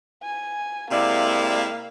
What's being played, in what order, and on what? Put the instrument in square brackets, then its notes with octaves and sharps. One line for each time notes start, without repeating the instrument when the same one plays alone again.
[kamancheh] G#5
[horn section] C3 G#3 E4 [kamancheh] A#3 [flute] D5 [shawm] F5